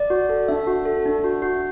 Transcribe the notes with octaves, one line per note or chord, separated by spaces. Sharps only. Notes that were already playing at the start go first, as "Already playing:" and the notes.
Already playing: D5
F#4
A4
D4 E5
F#4
A4
D4
F#4
F#4